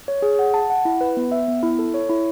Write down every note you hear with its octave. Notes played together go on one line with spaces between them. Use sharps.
C#5
G#4
F#5
A5
F#5
E4
B4
B3
E5
B3
E4
A4
C#5
E4